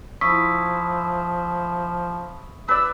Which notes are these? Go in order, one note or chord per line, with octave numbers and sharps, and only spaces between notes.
F3 E4 C#6 D#6 B6
B4 D5 E6